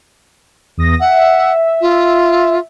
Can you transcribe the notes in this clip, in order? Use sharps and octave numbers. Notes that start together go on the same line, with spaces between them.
E2 D#6 A#6
E5 F#5
F4